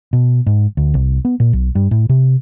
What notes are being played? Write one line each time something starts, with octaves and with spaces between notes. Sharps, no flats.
B2
G#2
D2
C2
B3
A#2
B1
G2
A2
C3